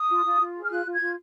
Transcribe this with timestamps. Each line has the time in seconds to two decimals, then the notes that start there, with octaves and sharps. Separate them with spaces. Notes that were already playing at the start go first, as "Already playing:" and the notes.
Already playing: D#6
0.09 F4
0.25 F4
0.40 F4
0.54 G#4
0.62 F6
0.70 F4 F#6
0.86 F4
0.93 G#6
1.01 F4